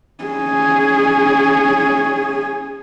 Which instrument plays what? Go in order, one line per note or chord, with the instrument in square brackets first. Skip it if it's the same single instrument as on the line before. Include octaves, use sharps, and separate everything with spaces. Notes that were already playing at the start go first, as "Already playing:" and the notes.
[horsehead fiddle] C#4 G#4